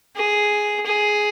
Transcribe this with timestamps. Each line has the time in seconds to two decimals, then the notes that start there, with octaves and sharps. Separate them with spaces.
0.16 G#4
0.86 G#4